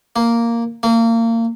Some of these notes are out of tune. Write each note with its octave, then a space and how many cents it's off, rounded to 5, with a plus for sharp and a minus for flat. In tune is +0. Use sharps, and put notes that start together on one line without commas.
A#3 -5
A#3 -30